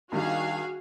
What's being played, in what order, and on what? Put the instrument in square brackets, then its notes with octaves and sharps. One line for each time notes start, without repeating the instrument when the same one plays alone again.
[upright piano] A#1 D#3 G3 [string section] F#4 G#4 F5